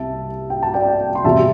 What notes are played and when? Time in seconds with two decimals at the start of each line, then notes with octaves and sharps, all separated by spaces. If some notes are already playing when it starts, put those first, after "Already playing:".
Already playing: C2 C3 G3 E5 A5
0.50 G5
0.63 A5
0.74 D5 G5
1.15 C6
1.24 E2 C3 G3 E5 A5